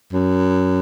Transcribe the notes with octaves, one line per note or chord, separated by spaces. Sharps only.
F#2